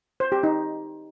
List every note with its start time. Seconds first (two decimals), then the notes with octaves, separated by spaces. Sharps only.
0.20 C5
0.32 G4
0.43 D#4